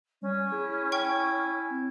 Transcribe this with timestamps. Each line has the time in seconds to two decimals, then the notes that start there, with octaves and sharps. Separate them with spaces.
0.22 G3 C#4
0.52 E4 G#4
0.92 G5 G#5 C#6
1.70 C4